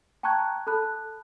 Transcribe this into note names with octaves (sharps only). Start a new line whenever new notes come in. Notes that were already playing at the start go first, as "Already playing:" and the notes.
G5 A5 A#5 C#6 F#6 G#6
A4 A5 B5 F#6